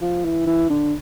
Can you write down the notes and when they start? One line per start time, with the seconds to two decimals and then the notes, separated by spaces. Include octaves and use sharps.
0.02 F3
0.25 E3
0.47 E3
0.70 D3